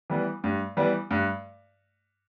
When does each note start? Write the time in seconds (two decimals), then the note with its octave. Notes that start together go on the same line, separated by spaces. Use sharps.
0.10 E3 G3 B3
0.44 G2
0.77 E3 G3 B3
1.11 G2